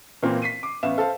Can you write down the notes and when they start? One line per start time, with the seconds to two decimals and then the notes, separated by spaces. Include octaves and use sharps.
0.23 A#2 E3 A#3 C4
0.42 B6 C7 D#7
0.63 D6
0.83 A1 B3 E5 F5 E7
0.98 A4 C5 F5